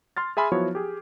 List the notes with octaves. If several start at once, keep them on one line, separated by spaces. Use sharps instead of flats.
C6 F6 A6
G#4 E5 G#5 B5 C6 F6
F3 F#3 B3 E4 F#4 C#5
G4 G#4